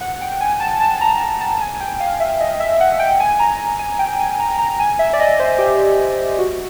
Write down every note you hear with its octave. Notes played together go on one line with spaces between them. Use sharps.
F#5
G5
G#5
A5
A5
A#5
A#5
A5
G#5
G5
F5
E5
D#5
E5
F#5
G5
G#5
A#5
G#5
G5
G#5
A#5
A#5
G#5
E5
D5
D#5
C5
G4
F#4